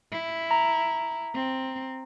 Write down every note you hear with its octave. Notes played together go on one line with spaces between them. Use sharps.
E4
A#5
C4